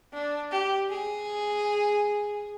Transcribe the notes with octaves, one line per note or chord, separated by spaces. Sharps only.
D4
G4
G#4